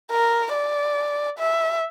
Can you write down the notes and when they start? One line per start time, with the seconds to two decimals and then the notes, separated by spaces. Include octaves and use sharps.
0.11 A#4
0.53 D5
1.38 E5